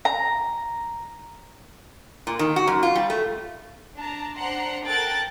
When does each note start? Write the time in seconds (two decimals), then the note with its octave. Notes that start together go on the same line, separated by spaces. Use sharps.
0.05 A#5
2.27 A#2
2.39 D#3
2.56 F#4
2.67 F#2
2.83 F4
2.96 G3
3.10 A3
3.97 D4 A5 A#5
4.37 D4 C5 F#5 A#5 C6
4.85 A4 A#4 G5 F#6 A6 D7